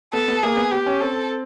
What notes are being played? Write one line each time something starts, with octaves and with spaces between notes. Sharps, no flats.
B3 A4
B3
A#3 G#4
B3
B3 G4
C#4
C4 A4